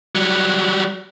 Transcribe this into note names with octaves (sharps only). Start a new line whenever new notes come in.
F#3 G3